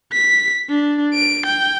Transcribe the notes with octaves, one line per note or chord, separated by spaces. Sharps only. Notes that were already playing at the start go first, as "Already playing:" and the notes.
B6
D4
D7
G5